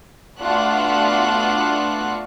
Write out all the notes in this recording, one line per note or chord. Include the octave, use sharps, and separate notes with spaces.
A3 B3 D4 F4 F#4 F#6